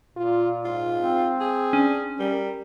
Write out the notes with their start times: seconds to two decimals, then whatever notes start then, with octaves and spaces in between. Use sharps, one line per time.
0.17 A#2 F4
0.65 G#2 F4
1.00 C4
1.40 G#4
1.73 C#4 D4
2.20 G3 A#4